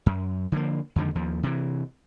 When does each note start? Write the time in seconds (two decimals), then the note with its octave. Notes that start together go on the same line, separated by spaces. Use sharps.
0.06 F#2
0.52 D3 F3 A#3
0.96 F2 D3 D#3 G#3
1.15 D#2 F3
1.43 C3 E3